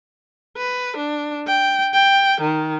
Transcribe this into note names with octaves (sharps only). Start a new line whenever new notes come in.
B4
D4
G5
G5
D#3